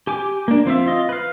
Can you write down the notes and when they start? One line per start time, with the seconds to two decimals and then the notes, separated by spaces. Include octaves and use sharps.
0.07 G4 G#5 D6
0.48 A#3 D4
0.66 F3 C4 F4 E5
0.86 F4 D#5
1.09 B4 F5